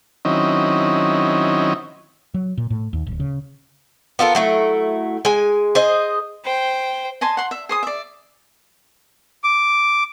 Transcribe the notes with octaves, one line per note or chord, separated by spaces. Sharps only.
D#3 F#3 C4 C#4 E4 D#5
F#3
A#2
A2
D#2
D1
C#3
B3 F4 A4 A#4
F#3 A3 E4
G#3 G#5
G#4 C5 D#5
C5 G5
D#5 G#5 A5 C6
F#5 C6
E5
G#4 C5 D#6
D5 E5
D6